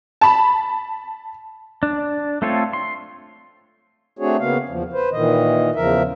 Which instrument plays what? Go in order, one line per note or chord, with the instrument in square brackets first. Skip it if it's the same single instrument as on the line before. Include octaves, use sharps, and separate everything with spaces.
[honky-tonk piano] A5 B5
[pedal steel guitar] D4
A3 C4 F4 A4 C#5
C6
[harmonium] A3 C4 D4 F#4 G#4 C#5
C#3 A#3 B3 F5
E2 F3
B4 C5
A#2 D#3 E3 D#5
E2 C#3 F3 A#4 E5